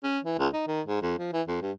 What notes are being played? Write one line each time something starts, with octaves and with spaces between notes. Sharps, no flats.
C#4
E3
C#2
D#4
D#3
G#2
F2
F3
E3
F2
G2